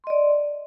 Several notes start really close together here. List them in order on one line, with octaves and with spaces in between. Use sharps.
C6 D#5 D5